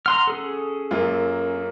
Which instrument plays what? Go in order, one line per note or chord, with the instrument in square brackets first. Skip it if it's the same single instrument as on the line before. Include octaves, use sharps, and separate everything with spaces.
[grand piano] F#5 [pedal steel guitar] A#5 C6 F6
[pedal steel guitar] C#4 G#4 A4
[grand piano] F#2 A#3 F4